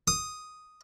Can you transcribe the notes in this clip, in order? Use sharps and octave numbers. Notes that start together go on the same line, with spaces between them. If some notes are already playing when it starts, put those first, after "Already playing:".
D#6